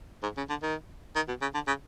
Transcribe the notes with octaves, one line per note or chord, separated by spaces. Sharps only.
G#2
C#3
D3
D#3
D#3
B2
C#3
D3
C#3